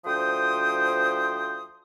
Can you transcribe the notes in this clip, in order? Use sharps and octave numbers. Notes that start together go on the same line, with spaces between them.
D2 F3 C5 G5 D#6